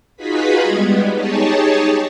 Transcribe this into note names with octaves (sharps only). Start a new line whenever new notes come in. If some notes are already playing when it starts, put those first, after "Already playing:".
D#4 F4 F#4 G#4 B4 B5
G3 G#3 B3
D#4 G4 G#4 C#5 A5